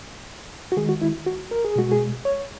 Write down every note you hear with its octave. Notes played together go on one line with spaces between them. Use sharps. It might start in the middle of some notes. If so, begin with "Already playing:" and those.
F#4
D#3 G#3 G#4
F#4
E4
F#4
A#4
G#4
B2 G#3 F#4
G#4
C#5